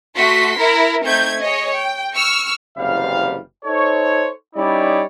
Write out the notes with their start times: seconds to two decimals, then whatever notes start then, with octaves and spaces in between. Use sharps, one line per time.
0.16 A3 F#4 C6 B6
0.57 E4 A#4
1.04 A3 C4 D#4 G6 G#6
1.40 G#4 C#5 D#5
1.75 G5
2.13 C#6 E6 F6
2.77 F#1 C3 E3 G3 F5
3.65 D#4 A4 C5 C#5
4.55 G3 C#4 D#4 E4 C#5 D5